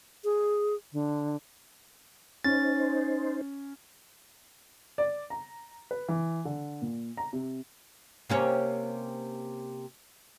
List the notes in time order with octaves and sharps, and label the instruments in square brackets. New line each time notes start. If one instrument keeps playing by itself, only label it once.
[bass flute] G#4
D3
[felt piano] C#4 [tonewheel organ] D#4 C5 [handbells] A6
[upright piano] D5
A#5
B4
E3
D3
A#2
A#5
C3
[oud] C3 A#3 C#4